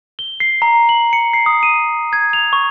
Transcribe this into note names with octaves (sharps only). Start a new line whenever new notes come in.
G7
C7
A#5
F#7
C#7
C7
D#6
D#7
G#6
F7
C#6